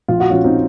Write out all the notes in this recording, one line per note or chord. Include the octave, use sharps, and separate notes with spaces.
A#1 F4
F#4
A#1 C#4 F4
C4 D#4